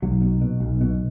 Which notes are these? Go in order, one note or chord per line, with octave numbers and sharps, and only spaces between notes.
B1 F#3
B2
B2
B1
B2